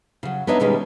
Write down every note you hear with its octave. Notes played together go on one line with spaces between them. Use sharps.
C#3 F#3
B3 D4 D#4 C#5 E5
B2 D#3 G3 G#3 C#4 B4